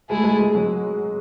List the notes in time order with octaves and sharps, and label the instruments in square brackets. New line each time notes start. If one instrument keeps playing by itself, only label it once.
[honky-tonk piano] G#3 [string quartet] A3 E4 G#4
[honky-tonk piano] G#3
G#3
F#3